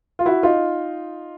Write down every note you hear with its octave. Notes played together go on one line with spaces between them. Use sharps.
F4
E4 F#4
D#4 F4